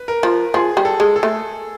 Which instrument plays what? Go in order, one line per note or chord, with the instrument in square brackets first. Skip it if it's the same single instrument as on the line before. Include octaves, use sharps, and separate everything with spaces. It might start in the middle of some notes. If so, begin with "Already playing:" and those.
Already playing: [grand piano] B4
A#4
[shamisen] F3
[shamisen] F3 [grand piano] G#4
[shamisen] G3
[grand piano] A4
[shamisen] G#3
[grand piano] A4
[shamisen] A3